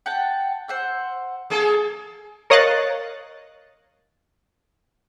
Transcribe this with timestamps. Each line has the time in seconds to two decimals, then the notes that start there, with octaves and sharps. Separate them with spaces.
0.06 F#5 G5 A5
0.68 C5 F#5 E6
1.50 A#3 G#4 A4
2.50 A#4 C#5 D#5 F5 F#6 A6